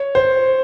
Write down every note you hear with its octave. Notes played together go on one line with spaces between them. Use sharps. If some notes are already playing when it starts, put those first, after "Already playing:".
Already playing: C#5
C5